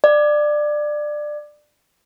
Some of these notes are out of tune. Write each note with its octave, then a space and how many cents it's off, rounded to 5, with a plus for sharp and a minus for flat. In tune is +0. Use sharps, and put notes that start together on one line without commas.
D5 +20